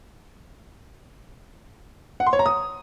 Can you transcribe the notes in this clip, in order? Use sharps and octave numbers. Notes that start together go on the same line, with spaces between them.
F#5
C6
C#5
A#5
D#6